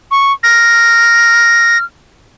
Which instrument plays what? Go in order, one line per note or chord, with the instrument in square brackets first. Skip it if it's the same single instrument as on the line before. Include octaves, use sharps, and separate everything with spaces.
[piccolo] C#6
[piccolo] F6 [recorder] A#6